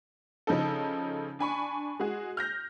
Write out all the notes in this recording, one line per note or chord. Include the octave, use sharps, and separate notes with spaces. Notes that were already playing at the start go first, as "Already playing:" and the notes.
C#3 F3 D#4 A4
D4 G#5 B5 C#6
G#3 F#4 G#4
F6 G6 A#6